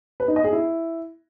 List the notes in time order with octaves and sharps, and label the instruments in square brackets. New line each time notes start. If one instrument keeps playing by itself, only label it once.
[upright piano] B4
D#4
D#5
G#4
E4